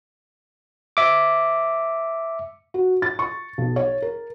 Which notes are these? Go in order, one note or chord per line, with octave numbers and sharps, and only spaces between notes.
E5 D6
F#4
A6
C#6
B1
C#5
A#4